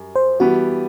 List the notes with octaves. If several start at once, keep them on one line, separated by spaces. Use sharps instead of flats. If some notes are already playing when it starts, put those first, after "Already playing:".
Already playing: F#2 G3
C5
E3 G3 B3 F#4